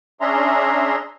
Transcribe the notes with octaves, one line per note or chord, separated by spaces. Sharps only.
C#4 D4 G#4 E5 A#5 C6